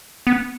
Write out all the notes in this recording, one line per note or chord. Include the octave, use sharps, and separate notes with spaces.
B3